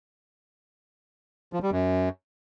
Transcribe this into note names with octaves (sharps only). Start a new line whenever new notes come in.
F3
G3
F#2